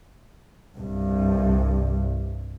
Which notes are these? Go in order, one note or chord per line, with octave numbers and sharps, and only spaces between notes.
C2 G2